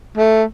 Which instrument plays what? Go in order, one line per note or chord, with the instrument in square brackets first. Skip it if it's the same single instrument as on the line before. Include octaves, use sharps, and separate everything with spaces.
[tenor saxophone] A3